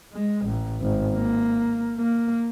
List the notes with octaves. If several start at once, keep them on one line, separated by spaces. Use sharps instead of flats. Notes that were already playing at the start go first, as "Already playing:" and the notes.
G#3
A1
G#1
A#3
A#3